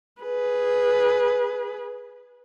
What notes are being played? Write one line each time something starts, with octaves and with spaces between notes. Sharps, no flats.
G#4 B4